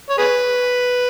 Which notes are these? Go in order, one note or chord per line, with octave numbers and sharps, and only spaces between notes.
C#5
G#4 B4